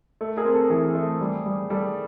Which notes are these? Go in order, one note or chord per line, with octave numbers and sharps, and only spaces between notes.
A3
G#4 A#4
C4
A4
E3 G#4
A3
G3
G3
G3 A4